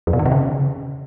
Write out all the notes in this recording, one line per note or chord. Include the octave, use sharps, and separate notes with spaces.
F2
B2
D#3
C3
C#3